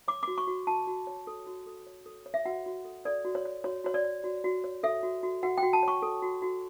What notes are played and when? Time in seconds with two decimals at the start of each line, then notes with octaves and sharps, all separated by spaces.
0.08 C#5 D6
0.23 F#4 D6
0.38 C#6
0.47 F#4
0.67 F#4 A5
0.87 F#4
1.07 C#5
1.27 A4
1.47 F#4
1.67 A4
1.87 C#5
2.06 A4
2.26 C#5
2.34 E5
2.45 F#4 F#5
2.66 F#4
2.85 A4
3.05 A4 D5
3.25 F#4
3.35 C#5
3.45 C#5
3.64 F#4 C#5
3.84 F#4 C#5
3.94 D5
4.04 C#5
4.24 F#4
4.44 F#4
4.64 C#5
4.83 A4 E5
5.03 F#4
5.23 F#4
5.43 F#4 F#5
5.58 G5
5.63 F#4
5.73 A5
5.83 C#5 C#6
6.02 A4
6.22 F#4
6.42 F#4